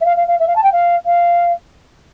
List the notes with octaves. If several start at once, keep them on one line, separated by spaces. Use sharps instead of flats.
E5
F5
F5
F5
E5
F5
A5
G5
F5
F5